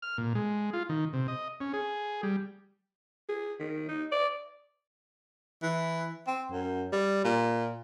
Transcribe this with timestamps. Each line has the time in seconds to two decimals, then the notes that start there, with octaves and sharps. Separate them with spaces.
0.02 F6
0.18 A#2
0.35 G#3
0.73 F4
0.89 D#3
1.13 C3
1.28 D#5
1.60 C#4
1.73 G#4
2.23 G3
3.29 G#4
3.60 D#3
3.88 D#4
4.12 D5
5.63 E3
6.27 C4
6.51 F#2
6.92 G3
7.24 A#2